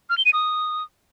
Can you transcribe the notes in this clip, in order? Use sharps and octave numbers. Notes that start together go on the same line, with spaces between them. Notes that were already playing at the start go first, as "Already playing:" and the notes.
F6
G7
D#7
D#6